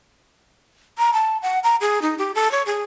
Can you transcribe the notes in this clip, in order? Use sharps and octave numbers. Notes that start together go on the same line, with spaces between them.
A#5
A5
F#5
A#5
G#4
D#4
G4
A4
C#5
G#4